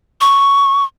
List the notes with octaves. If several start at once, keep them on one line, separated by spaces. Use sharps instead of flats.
C#6